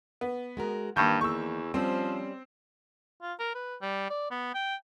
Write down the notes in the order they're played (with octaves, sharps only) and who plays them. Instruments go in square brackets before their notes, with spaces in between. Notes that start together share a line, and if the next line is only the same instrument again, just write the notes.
[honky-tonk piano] B3
[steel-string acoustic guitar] G#3 F#4 A#4
[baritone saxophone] G2 [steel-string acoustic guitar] D#3 E3 A#3 [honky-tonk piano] C#6 G6
[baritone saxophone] E2 [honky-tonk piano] C#6 E6
[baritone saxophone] F3 [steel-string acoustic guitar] G3 C#4 [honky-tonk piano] C4
[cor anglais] F4
A#4
B4
G3
D5
B3
G5